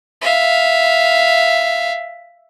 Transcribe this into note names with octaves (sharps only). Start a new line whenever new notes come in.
E5 F5